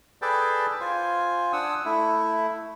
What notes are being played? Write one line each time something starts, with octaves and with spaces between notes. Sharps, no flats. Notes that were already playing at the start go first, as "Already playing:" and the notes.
G#4 A4 B4 D5 G5 A5
F4 C5 G#5
D4 F#5 D#6 E6
A3 E4